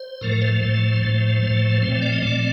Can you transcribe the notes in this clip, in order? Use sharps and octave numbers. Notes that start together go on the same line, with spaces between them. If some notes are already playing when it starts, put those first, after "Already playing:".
Already playing: C5
A2 F3 A3 A#4
A#4
C5
A2 F3 A3 C5
A2 F3 A3
A2 F3 A3
A#2 F3 A3 C4 C5
C5
D5
D#5
A#2 F3 A3 C4 D5